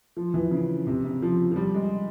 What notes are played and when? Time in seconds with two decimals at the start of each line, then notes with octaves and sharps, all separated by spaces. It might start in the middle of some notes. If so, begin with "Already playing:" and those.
0.17 F3
0.34 E3
0.51 C#3
0.87 C3
1.04 C#3
1.22 F3
1.52 F3
1.56 G3
1.74 G#3